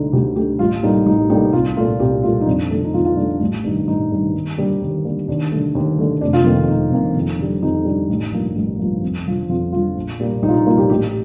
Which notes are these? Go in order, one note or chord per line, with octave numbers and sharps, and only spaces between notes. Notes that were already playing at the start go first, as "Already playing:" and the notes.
Already playing: D2 D3 A3 D#4
D2 G4
D3 A3 G4
A1 F4
A2 G3 A#3 D#4
A1 D#4
A2 G3 A#3 D#4
C2 F4
A#2 A3 F4
C2 G4
A#2 A3 F4
D#4
F2 D4
D3 A3
D#4
F2 F4
F4
D3 A3 D4
D4
A1 D4
G2 D#3 G3 D#4
A1 D#4
G2 D#3 G3
D#2
D3 G3 A#3
D#2
D3 G3 A#3
D#2 D4
D3 A3
D#2
D3 A3
F1 D4
F4
F2 D#3 A#3 D#4
F1 D#4
F2 D#3 A#3
F2
D3 G3
F2 D#4
D3 G3
A1
G2 F3 A#3
A1
G2 F3 A#3
F2
D3 F3
F2 F4
D3 F3 F4
A#1
A#2 G3 A#3
A#1 D#4
F4
D#4
A#2 G3 A#3 F4
G4
A1 G4